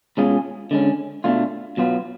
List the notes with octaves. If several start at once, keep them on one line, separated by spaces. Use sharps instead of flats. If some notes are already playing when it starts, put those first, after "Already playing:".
B2 G#3 C#4 F4 G#4
D3 G#3 C#4
B2 A3 D4 F4
B2 F#3 B3 F4